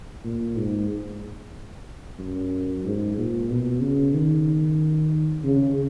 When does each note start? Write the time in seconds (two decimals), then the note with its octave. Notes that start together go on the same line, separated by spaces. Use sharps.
0.24 A#2
0.57 G#2
2.19 F#2
2.84 G#2
3.17 A#2
3.50 B2
3.81 C#3
4.14 D#3
5.44 C#3